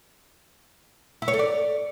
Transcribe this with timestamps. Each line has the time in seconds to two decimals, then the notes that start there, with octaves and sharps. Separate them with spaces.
1.22 E4
1.28 C#5
1.34 A4
1.39 D5